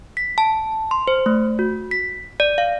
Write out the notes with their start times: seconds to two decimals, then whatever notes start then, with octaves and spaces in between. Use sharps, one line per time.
0.17 B6
0.38 A5
0.91 C6
1.07 C5
1.26 A3
1.59 F#4
1.91 B6
2.40 D5
2.58 F5